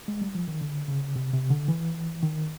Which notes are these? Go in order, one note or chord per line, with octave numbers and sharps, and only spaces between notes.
G#3
G3
F3
D#3
D3
C#3
C3
C3
D3
E3
D#3